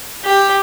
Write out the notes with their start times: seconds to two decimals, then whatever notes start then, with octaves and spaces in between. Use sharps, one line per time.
0.25 G4